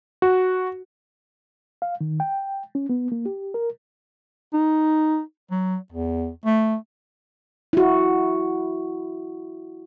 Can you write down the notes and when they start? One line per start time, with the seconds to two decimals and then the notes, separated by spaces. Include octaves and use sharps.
0.22 F#4
1.82 F5
2.01 D#3
2.20 G5
2.75 C#4
2.89 B3
3.12 A#3
3.26 G4
3.54 A#4
4.53 D#4
5.51 F#3
5.92 E2
6.46 A3
7.73 E4 F#4